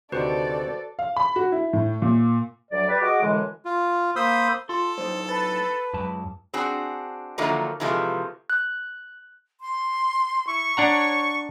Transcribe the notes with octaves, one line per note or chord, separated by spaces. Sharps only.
D2 C3 D#3 F#4 A4 B4 C5 D5
F5
B5
F#4
E4
A2
A#2
D2 F#3 D5
G3 G4 B4 D5
F#4 G#4 D#5 D6
F#2 A2 D3 E3 G#3
F4
A#3 C5 B5 C6 D#6 E6
F4 A4 C6
A2 F#3 D#4 C5
B4 A5
C#2 F#2 A5
C4 D4 F#4 G#4
D3 D#3 F3 F#3 A3 A#3
C3 E3 F3 G#3 A3
F#6
C6
E4 C#6
D4 C#5 F#5 A#5